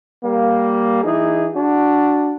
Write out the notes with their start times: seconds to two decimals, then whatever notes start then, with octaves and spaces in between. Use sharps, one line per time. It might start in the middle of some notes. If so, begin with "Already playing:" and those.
0.24 G3 A#3
1.04 E3 D#4 G#4
1.55 D4 F#4